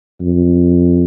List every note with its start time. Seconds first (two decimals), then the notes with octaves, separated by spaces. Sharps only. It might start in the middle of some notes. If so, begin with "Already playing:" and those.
0.21 F2